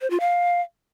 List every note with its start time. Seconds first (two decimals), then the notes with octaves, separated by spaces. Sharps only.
0.01 C5
0.10 F4
0.20 F5